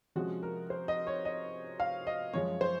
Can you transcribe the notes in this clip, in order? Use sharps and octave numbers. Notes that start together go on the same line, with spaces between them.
C3 F3 G#3 C#4 F#4
A#4
C5
D#5
C#5
D#5
F5
D#5
F#2 F3 G#3 C#4 C#5
C5